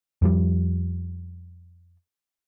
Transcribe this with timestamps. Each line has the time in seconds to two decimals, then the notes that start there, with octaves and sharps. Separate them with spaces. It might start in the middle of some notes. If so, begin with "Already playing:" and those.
0.22 F2 F3 G3